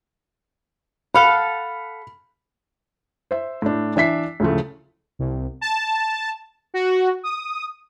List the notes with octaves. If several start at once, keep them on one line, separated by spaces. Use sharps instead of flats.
A4 F5 F#5 B5
C5 E5
A2 D4
E3 D4 E5 B6 C7
D2 A2 C#3 F3 A3
C2
A5
F#4
D#6